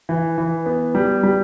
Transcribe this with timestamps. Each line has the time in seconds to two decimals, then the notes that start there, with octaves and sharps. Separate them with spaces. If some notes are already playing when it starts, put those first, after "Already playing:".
0.09 E3
0.38 E3
0.66 B3
0.95 G3
1.23 G3